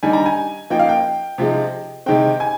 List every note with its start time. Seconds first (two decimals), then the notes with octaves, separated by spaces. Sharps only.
0.03 D#3 G3 D4 G#5
0.13 A#5
0.26 G#5
0.70 F3 A#3 D#4 G5
0.79 F5
0.89 G5
1.38 C3 F3 G#3 D#4
2.06 C3 D#3 G#3 C4 G5
2.40 G#5